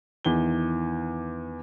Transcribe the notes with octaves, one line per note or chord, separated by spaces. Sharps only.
E2 D#3 E3 G7